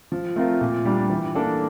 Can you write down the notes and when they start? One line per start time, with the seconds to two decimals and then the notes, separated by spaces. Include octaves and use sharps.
0.12 F3
0.36 A3 C4 F4 A#4
0.61 A#2
0.85 G3 D4 G4
1.10 E3
1.35 A#3 D4 A4